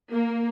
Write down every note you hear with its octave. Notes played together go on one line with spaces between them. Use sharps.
A#3